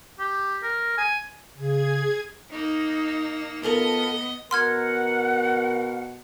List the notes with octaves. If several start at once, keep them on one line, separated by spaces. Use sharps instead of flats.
G4
A#4
G#5
C#3 G#4 G#6
A#3 D#4
B3 F4 A4 A#4 D#5
B2 A#4 F#5 C6 F6 G#6